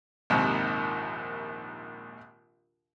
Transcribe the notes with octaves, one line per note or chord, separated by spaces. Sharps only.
A#1 D#2 G#2 C3